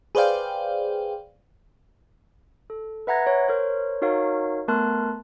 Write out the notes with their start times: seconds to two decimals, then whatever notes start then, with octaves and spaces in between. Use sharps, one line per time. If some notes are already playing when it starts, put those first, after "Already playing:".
0.15 G#4 B4 C5 D5 F5 G5
2.70 A4
3.07 B4 E5 F#5 A#5 G#6 A#6
3.27 C#5
3.48 A#4 C5 C#5
4.02 D#4 F#4 A#4 C#5 F5
4.68 A3 B3 A#4 A5 C6 F#6